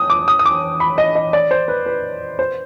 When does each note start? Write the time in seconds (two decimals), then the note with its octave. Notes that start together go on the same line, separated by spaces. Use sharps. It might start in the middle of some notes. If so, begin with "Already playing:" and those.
Already playing: D#6
0.10 D6
0.28 D#6
0.39 D#6
0.46 D6
0.80 B5
0.98 D#5
1.15 D#5
1.33 D5
1.51 C5
1.68 B4
1.86 B4
2.39 C5